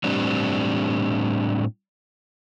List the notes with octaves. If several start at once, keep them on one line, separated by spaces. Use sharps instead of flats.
A2 G3 C4 D4